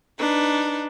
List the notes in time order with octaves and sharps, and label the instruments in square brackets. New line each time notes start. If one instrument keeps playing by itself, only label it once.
[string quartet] D4 D#4 B4